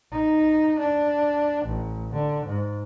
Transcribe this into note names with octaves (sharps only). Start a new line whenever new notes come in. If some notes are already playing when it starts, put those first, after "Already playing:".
D#4
D4
A1
D3
G#2